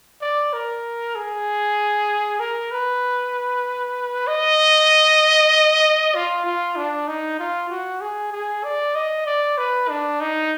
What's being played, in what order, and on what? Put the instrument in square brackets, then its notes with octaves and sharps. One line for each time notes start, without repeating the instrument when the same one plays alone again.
[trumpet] D5
A#4
G#4
A#4
B4
D#5
F4
F4
D4
D#4
F4
F#4
G#4
G#4
D5
D#5
D5
B4
D4
D#4